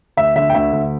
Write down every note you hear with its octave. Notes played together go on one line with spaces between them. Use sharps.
D2 E5
D3 E5
G5
D2 E5
D2